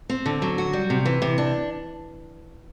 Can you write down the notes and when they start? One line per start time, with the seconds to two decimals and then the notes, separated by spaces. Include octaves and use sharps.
0.09 C4
0.26 D3
0.42 F#3
0.58 F#4
0.73 G3
0.90 C3
1.05 E3
1.22 C3
1.38 D4